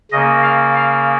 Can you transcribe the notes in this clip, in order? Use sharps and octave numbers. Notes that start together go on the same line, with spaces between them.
C#3 A#3 D#5
F5
F5